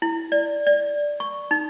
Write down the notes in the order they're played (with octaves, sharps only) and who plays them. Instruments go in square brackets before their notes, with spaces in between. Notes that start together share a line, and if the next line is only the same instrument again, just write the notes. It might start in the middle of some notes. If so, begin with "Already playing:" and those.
[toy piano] E4
D5
D5
C#6
D#4